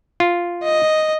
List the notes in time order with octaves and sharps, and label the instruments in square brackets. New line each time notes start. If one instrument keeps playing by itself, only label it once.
[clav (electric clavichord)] F4
[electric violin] D#5